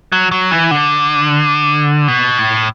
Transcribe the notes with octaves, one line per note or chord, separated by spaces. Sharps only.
F#3
F#3
E3
D3
B2
A2